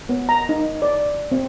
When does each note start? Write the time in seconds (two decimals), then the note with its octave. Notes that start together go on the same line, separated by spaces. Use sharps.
0.09 B3
0.29 A#5
0.49 D#4
0.82 D5
1.31 C4